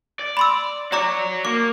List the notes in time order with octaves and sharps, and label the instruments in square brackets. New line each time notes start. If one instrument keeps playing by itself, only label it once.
[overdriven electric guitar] D5
[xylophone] B5 C6 E6
[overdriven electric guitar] F#4 C#5 [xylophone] D5 A#5 D6
[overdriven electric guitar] A#3 [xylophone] D6